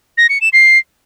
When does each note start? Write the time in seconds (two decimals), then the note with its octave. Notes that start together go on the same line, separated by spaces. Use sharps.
0.18 A#6
0.29 C#7
0.41 E7
0.53 C7